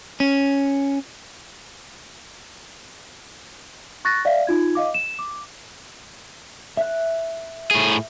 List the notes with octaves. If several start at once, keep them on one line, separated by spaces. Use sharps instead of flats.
C#4
C#6 F#6 A6 A#6
D5 E5 F5
D#4 F4 G#6
D#5 F5 D6
E7
D6
E5 F#6
A2 G#4